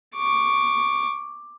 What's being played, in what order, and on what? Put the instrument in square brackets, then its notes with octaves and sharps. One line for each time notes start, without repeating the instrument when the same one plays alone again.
[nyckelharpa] C#6 D6